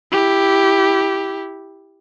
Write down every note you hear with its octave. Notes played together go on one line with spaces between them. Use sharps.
E4 G4